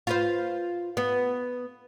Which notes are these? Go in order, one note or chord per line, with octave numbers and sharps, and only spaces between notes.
F4 B4 C5
B3